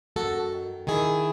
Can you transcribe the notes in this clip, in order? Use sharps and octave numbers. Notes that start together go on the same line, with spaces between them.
F#2 F#4 A4
D#3
D#3 E4 G#4